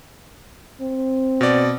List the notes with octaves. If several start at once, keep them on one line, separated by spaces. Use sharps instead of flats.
C4
B2 D5